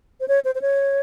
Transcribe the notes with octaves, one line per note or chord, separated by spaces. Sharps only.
C5
C#5
C5
C5
C#5